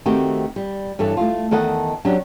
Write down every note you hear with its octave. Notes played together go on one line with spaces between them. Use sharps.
D#3 A3 C4 F#4 G4
G3
G2 E3 A4 C#5
A3 F4
E2 D#3 A4 D#5 F#5
F#3 C#4 D4 F#4 G4